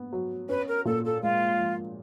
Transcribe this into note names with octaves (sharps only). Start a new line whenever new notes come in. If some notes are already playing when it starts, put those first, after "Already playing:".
Already playing: B3
F#3
C#4 B4
A#4
A#2 A4
A4
G#3 F4
F3